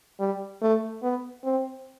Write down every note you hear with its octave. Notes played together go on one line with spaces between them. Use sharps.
G3
A3
B3
C4